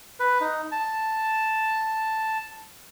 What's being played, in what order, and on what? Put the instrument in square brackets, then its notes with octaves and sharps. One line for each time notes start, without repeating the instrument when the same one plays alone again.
[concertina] B4
D#4
A5